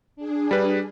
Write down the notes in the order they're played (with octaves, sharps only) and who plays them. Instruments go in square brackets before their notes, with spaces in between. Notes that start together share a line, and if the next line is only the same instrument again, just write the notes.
[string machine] D4 G#4
[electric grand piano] G3 B4